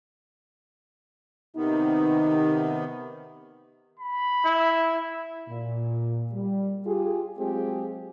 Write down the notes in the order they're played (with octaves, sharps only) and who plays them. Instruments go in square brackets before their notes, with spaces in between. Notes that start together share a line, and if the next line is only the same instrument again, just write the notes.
[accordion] C3 D#3 B3 [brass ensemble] D#4
[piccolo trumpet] B5
[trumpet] E4
[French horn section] A#2
G3
F4 G4 G#4
F#3 G#3 C4 F4 G4 G#4